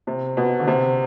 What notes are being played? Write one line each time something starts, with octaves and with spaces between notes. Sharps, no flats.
C3
B2
D3
C3